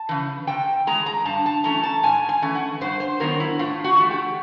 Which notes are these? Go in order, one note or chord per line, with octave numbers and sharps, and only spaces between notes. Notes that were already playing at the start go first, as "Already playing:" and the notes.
Already playing: A5
C#3 E3
C3 G5
E3 G#3 A#5
A#5
G2 A5
A5
E3 A3 C#4 A#5
A5
G#2 G#5
G#5
E3 A3 C#4
F#5
G2 C5
C5
D#3 F#3 B3 D4 A#4
E4
A2 F4
F#4
E3 A3
G4